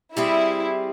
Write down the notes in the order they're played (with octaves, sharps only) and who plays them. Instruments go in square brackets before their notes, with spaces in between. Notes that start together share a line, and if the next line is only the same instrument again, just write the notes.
[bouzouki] G3 C4 G#4 [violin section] E4